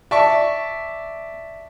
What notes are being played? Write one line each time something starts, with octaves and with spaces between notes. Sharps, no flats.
D5 E5 A5 C#6